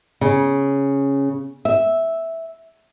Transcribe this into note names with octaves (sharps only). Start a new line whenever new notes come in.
C#3
E5